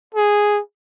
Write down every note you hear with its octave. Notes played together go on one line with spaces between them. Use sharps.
G#4